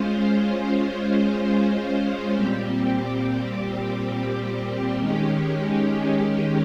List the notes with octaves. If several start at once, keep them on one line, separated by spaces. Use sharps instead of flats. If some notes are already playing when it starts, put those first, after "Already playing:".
Already playing: G#3 C#4 F4 C5
A#2 G3 C4 G4
D#3 G#3 C#4 G4